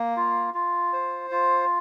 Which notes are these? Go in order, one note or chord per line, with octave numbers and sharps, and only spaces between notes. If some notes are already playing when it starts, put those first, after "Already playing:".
Already playing: A#3
F4
F4
C5
F4